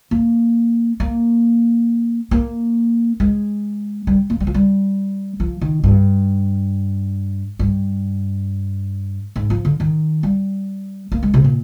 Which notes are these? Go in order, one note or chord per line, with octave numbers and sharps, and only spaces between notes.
A#3
A#3
A#3
G#3
G3
A#3
G3
F3
G3
F3
D#3
G2
G2
G#2
F3
D3
D#3
G3
A#3
G#3
C3
A#2